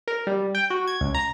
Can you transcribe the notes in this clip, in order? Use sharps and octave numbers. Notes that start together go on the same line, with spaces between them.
A#4
G3
G5
F#4
G#6
C#2
A#5